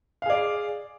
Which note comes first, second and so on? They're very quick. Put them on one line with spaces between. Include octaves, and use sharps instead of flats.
F5 G#4 D5